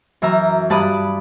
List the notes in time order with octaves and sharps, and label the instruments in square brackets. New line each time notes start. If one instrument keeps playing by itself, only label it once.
[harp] F#2 E3 E5 A#5
G2 A5 B5 D6 D#6 F#6